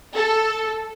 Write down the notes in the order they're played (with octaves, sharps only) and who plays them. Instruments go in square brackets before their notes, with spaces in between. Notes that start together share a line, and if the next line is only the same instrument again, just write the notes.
[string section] A4